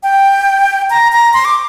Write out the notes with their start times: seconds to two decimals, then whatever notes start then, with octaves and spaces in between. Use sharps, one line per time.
0.03 G5
0.90 A#5
1.12 A#5
1.34 C6
1.45 D6